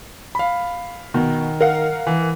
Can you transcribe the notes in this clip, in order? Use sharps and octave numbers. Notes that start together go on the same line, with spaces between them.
F5 B5
B2 D#3
A#4 F5 F#5
E3